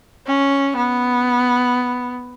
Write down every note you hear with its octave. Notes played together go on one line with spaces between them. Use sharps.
C#4
B3